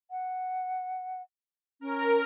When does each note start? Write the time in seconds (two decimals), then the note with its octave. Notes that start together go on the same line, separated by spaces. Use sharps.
0.11 F#5
1.81 C#4 A#4